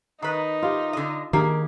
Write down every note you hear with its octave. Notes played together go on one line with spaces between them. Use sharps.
D#3 D#4 B4
F4 G4
D3 D#5
D#3 A#3 D4 G4 G#4